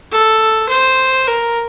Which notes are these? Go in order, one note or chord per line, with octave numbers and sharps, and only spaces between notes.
A4
C5
A#4